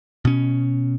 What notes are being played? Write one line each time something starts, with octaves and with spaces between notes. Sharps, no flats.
B2 C#4